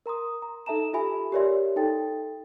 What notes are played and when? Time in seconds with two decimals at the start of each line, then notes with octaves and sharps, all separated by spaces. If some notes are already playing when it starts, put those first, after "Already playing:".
0.06 A#4 A#5 C6 D#6
0.42 A#5
0.66 D#4 A4 E5 A5 A#5 E7
0.93 F4 G4 A4 E5 G#5 B5
1.32 G4 A#4 C#5 D5 E5 C6
1.76 D#4 A4 G5 A6